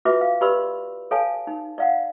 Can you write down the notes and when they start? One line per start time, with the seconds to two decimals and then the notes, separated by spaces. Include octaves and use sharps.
0.05 F4 F#4 B4 E5 D6
0.21 F5
0.41 G4 B4 D5 B5 C6 E6
1.11 A4 C#5 F5 G#5 A5
1.47 D#4
1.78 D5 F5 F#5